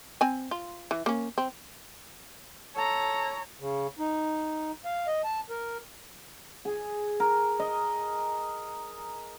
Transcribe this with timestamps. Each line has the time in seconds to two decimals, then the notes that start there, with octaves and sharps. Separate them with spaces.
0.21 C4 G#5
0.51 F4
0.91 E3
1.06 A#3 C#4
1.38 C4
2.76 A4 C#5 A#5
3.60 C#3
3.99 D#4
4.85 F5
5.07 D#5
5.24 A5
5.50 A#4
6.65 G#4
7.20 A#4
7.60 D#5